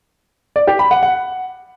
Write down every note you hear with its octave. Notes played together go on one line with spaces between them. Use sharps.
D5
G4
B5
F#5
F#5